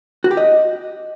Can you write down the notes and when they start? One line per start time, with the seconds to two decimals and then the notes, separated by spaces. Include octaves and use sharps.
0.24 F#4
0.31 G4
0.37 D#5